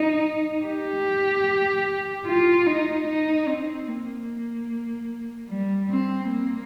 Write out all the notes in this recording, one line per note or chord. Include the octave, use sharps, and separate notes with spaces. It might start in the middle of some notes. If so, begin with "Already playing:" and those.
Already playing: D#4
G4
F4
D#4
D#4
C4
A#3
G3
C4
A#3